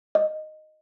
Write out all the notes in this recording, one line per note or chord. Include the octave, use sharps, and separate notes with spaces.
D#5